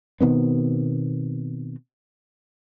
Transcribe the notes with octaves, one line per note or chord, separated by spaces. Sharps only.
B2 D#3 B3 C4